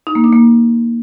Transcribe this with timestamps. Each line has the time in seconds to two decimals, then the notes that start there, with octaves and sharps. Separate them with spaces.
0.07 D#4
0.15 A#3
0.24 D4
0.33 A#3